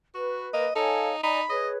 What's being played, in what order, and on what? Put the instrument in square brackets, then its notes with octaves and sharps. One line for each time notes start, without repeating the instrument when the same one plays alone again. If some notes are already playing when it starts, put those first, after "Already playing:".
[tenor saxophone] F#4 [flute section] B4
[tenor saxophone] A#3 [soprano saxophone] D#5
[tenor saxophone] D#4 [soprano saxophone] A4 [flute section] C#5 F5 G#5
[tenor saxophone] D#4 [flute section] D5 G#5 A#5 [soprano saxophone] B5
[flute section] G#4 B4 C#5 [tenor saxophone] D#5